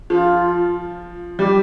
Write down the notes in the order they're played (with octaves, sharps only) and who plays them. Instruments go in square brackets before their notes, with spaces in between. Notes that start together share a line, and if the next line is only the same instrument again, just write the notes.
[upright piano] F3 [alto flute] F4
[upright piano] G3 [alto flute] G4